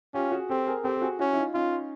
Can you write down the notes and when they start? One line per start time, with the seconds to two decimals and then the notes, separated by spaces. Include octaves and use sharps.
0.14 C#4 F4 G4
0.32 F#4 G#4
0.49 C4 G4 A4
0.67 G#4 A#4
0.84 C4 G4 A4
0.97 A4
1.02 F#4 G#4
1.19 C#4 E4 F#4
1.33 E4
1.37 D#4 F4
1.54 C#4 D#4 F4